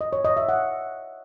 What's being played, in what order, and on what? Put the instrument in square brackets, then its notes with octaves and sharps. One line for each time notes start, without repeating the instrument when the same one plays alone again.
[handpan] D#5
C#5
D#5
E5
F#5